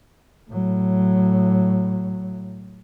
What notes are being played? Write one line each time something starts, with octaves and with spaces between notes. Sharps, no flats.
A2 F#3